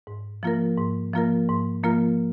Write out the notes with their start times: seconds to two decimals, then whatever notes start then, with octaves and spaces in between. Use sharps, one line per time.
0.07 G#2
0.43 F3 A#3 F4 A#4
0.78 G#2
1.14 F3 A#3 F4 A#4
1.49 G#2
1.84 F3 A#3 F4 A#4